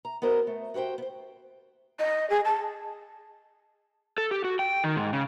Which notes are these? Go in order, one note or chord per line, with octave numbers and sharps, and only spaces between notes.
A#5
B3 F#4 A#4 C5 C#5 D#5
A3
F#4 G4 B4 C5 G5
B3 C5
D#5
G#4
A5
A4
G4
F#4
G5
D#3
G#2
C#3